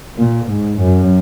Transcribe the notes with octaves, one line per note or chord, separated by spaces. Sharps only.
A#2
G#2
F#2